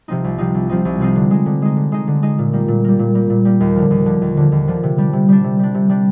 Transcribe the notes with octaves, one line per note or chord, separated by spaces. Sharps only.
C3 F3 C4 D#4
C2
C3 F3 C4 D#4
C2
C3 F3 C4 D#4
C2
C3 F3 C4 D#4
D3
G#3 D#4
D3
G#3 D#4
D3
G#3 D#4
D3
G#3 D#4
A#2
G3 A#3
A#2
G3 A#3
A#2
G3 A#3
A#2
G3 A#3
D#2
D3 F3
D#2
D3 F3
D#2
D3 F3
D#2
D3 F3
C3
G3 D4
C3
G3 D4
C3
G3 D4
C3
G3 D4